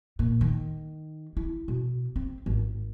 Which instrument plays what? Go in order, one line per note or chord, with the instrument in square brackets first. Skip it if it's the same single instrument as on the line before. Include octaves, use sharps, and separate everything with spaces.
[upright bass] A#2
D#3
E4
B2
C4
G#1